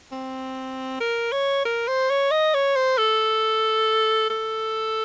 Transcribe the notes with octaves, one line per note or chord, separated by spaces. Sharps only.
C4
A#4
C#5
A#4
C5
C#5
D#5
C#5
C5
A4
A4